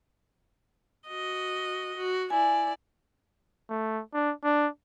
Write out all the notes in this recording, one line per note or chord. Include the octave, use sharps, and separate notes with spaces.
F#4 D#5
F#4
E4 D5 G#5
A3
D4
D4